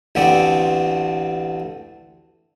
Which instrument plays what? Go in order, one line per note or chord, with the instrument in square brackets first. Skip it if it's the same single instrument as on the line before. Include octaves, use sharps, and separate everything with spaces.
[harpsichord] A1 D2 B3 C4 D4 D5